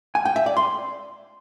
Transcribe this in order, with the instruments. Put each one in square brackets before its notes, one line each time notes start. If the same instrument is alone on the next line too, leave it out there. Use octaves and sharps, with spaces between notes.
[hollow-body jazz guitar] G#5
G5
E5
D5
C6